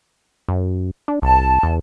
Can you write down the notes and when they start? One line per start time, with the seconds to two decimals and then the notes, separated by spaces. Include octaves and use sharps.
0.48 F#2
1.08 D4
1.22 C2 A5
1.63 E2